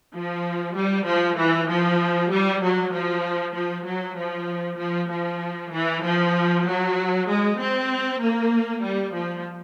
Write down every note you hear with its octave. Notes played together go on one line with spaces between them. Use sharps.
F3
G3
F3
E3
F3
G3
F#3
F3
F3
F#3
F3
F3
F3
E3
F3
F#3
G#3
C4
A#3
G3
F3